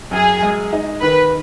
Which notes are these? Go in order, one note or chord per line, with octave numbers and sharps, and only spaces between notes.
F#2 G#4
G#3
D#4
D#3 B4